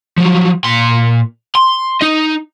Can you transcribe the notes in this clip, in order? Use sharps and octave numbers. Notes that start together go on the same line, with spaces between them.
F3 F#3
A#2 C6
C6
D#4 D#5